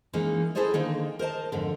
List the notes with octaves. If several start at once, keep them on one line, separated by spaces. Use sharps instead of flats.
E3 G#3 A#3 C#4 D#4
E4 G#4 A4 C5 C#5 D#5
D3 D#3 A#3 D#4
A#4 C5 D#5 A5
F2 G#2 D3